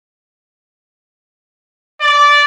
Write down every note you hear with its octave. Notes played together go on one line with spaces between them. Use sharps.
D5